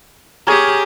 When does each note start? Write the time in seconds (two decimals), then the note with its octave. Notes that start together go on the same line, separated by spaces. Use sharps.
0.47 G4 G#4 A#4 C#5 G#5